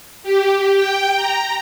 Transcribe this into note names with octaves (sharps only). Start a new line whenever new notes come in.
G4
G5
A#5